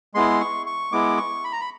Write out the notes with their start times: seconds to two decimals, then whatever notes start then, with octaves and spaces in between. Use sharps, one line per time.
0.15 G#3 B3 E4 C6
0.41 C#6
0.66 C#6
0.92 G#3 B3 E4 D6
1.17 C#6
1.44 B5
1.52 A#5
1.61 B5